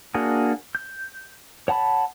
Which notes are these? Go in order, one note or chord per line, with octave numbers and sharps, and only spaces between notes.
A#3 D4 F#4 G#4
G6
C#5 F#5 A5 B5